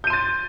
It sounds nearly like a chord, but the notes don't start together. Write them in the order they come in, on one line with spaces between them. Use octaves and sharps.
G6 D#7 C6 A6